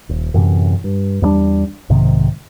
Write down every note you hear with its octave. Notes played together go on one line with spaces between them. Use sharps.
D#1
F#2 A2 C3 E3
G2
E2 G2 G3 D4
B1 G#2 C3 D#3